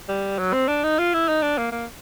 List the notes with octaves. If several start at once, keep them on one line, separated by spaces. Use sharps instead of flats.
G3
F#3
C4
D4
D#4
F4
E4
D#4
D4
A#3
A#3